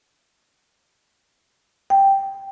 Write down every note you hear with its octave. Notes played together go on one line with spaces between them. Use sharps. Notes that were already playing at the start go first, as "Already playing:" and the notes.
G5